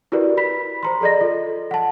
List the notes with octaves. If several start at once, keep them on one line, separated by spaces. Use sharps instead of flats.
E4 F#4 G4 A#4 B4 D5
B5 B6
C5 A#5 C6
G#4 A4 D5 D#5 A#6
F4 A4
F#5 A5